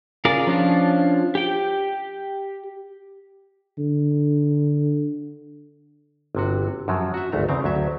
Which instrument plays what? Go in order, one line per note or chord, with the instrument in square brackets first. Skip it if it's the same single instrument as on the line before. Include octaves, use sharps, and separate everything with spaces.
[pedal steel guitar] C#3 F4 G#4 A#4 D5
F3 C#4 D4 F4
G4 G5
[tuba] D3
[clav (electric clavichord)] G1 C3 F#4
F#2 F3 F#3
F#4 E5
G#1 D2 A3 A#5
E2 C#3 C4 A#5
D2 F#3 E5